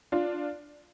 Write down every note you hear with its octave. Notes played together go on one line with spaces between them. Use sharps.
D4 F4